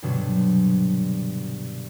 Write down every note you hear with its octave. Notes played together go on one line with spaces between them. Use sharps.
C2 G2 B2 D3 F#3 B3